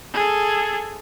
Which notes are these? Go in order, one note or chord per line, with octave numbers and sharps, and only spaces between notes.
G#4 A4